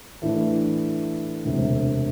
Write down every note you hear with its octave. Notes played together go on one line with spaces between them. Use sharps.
A2 E3 A3 D4
E1 D2 C3